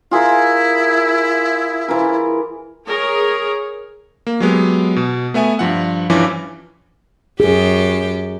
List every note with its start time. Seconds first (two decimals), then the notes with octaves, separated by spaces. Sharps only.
0.11 E4 F4 G#4 A#4
1.88 E3 F4 A#4
2.87 G#4 A#4 C#5
4.27 A#3
4.40 F#3 G#3 B3 G4
4.96 B2
5.34 A3 B3 E5 G#5
5.59 G2 F3 F#5
6.10 G2 E3 F3 C#4 G#5 D6
7.40 F#2 G4 G#4